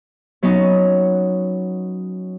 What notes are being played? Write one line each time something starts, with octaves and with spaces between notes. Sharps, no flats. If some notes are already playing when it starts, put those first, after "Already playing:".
F#3 B3 C#4 D#4